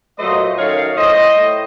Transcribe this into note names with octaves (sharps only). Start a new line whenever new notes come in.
A#2 F#3 A3 C5 D#5
F#2 D#3 A3 C#5 F5
A2 A3 C5 D#5
A2